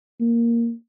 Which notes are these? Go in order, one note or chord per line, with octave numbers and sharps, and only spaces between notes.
A#3